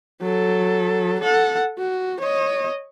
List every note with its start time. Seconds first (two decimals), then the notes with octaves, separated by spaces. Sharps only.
0.21 F#3 A4
1.20 A4 F#5
1.79 F#4
2.21 C#5 D#5